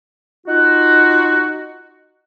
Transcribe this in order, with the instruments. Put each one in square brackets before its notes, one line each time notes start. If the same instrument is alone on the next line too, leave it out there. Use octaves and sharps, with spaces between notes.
[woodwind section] D#4 F4 F#4